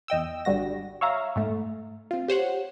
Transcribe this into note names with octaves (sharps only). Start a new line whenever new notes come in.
E2 D#5 G5 E6
G#1 D3 G3 F#4 A#6
C#5 E5 F5 A#5
G#2 A3
C4 F4
G4 C5 C#5 F#5